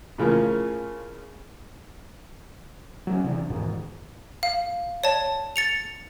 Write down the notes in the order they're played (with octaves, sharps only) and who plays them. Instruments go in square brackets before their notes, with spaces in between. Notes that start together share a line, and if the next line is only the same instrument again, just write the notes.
[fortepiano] A2 C#3 F3 A#3
[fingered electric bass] F#3 C4 C#4
D#1 C3 E3 D4
E2 G#2 B2 D#3
[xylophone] F5
C#5 D5 A5
A6 C#7 F7